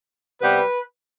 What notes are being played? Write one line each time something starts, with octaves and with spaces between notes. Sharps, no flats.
C3 G3 B3 B4